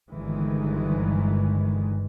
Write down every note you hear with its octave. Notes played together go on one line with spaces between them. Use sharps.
G1 G2 D#3 E3 G#3